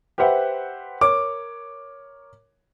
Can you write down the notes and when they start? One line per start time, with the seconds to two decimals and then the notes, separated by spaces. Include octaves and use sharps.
0.18 G4 B4 C5 E5 F#5
1.01 A#4 C#5 D6